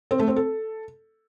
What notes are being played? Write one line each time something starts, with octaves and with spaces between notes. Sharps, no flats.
C4
A3
C4
A4